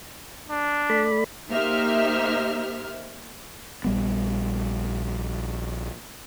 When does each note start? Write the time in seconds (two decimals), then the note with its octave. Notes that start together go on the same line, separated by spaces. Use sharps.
0.50 D4
0.89 A3 D5 B5
1.50 A#3 D#4 G4 C5 E5 F6
3.84 A#1 G3 B3